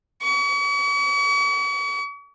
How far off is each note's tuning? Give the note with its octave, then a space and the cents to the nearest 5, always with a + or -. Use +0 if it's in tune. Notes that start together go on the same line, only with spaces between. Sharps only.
C#6 +45